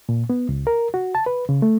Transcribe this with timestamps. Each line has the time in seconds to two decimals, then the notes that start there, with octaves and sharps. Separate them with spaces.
0.09 A#2
0.30 B3
0.49 C#2
0.67 A#4
0.94 F#4
1.15 A5
1.26 B4
1.49 C#3
1.62 A3